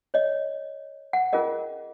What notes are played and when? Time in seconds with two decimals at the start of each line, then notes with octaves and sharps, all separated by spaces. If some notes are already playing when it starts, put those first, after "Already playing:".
0.14 C#5 D#5
1.13 F#5
1.33 C#4 F4 G#4 A#4 D#5